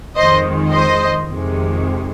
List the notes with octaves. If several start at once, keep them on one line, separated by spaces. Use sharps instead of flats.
F2 D#3 G#3 C5 D#5
C5 D#5
F2 C3 D#3 G#3